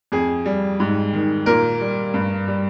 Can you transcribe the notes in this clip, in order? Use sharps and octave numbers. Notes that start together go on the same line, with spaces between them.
F2 G#4
G3
G#2
D#3
A#2 A#4
G3
G2
G3